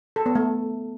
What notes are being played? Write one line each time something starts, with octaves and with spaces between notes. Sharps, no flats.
A4
B3
A3